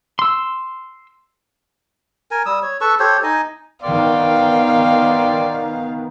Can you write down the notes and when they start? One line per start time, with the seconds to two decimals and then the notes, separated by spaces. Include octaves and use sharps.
0.19 C6 E6
2.31 A#4 G#5
2.46 G3 D#6 E6
2.62 C#5
2.81 A4 B4 C#6 E6
2.99 G4 A4 C5 C#5
3.23 D#4 D#5 G#5
3.83 D#3 B3 D5 F5 G5 C6